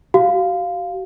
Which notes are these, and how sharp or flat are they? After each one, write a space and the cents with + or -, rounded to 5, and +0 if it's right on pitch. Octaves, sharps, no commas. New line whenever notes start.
F#4 +40 F5 +0